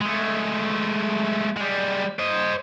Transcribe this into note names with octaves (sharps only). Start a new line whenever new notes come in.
G#3 A3
G3 G#3
C5 D#5